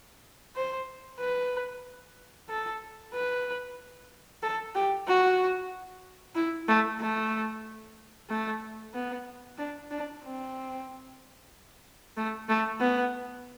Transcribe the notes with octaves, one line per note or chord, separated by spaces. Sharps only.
C5
B4
A4
B4
A4
G4
F#4
E4
A3
A3
A3
B3
D4
D4
C4
A3
A3
B3